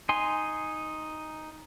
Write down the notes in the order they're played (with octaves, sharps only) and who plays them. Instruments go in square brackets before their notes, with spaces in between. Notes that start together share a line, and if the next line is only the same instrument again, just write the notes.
[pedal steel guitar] D#4 G#5 C6